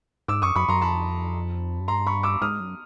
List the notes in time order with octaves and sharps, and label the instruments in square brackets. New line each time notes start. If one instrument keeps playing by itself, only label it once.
[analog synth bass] G#2 [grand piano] D6 E6
[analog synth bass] F#2 [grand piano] C#6 D#6
[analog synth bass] F#2 [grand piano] B5 C#6
[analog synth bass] F#2 [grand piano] A#5 C6
[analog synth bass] F2 [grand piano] A5 B5
[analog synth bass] F#2
[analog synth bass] G2 [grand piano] A#5 C6
[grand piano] B5 C#6
D6 E6
[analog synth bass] G#2 [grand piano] D#6 F6
[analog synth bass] F#2